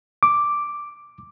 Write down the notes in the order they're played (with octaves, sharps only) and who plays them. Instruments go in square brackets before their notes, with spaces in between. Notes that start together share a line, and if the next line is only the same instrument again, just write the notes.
[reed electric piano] D6